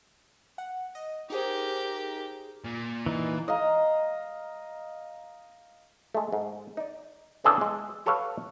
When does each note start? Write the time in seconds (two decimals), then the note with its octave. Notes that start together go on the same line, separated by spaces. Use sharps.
0.58 F#5
0.95 D#5
1.30 D#4 G4 G#4 A#4 C5
2.65 A#2
3.06 E3 D#4
3.48 D#5 F5 A#5
6.15 G#3 A3
6.32 G#2
6.77 D#4 D5
7.44 C#3 E3 C4 D4 G#4 A4
7.61 G#3
8.06 G4 A4 B4 C#5 F5 F#5